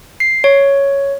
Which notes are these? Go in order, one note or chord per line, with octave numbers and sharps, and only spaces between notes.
C7
C#5